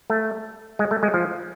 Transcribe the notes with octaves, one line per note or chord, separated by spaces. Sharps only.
A3
G#3
A3
G#3
F3